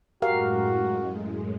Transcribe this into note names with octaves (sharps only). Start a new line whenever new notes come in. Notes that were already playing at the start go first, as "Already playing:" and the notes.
F#2 A2 G#3 F#4 G4 A#4 F5